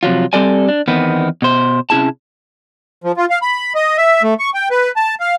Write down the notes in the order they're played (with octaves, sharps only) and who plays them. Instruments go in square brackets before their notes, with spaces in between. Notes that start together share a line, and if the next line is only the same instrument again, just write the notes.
[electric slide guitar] C3 F3 F#3 F4
G3 C4 G4 A4 D5 G#5
D4
E2 D#3 B3 C4
B2 C5
C3 C#4 E4 G#4 A5
[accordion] F3
F4
F5
B5
D#5
E5
A3
C#6
G5
B4
A5
F5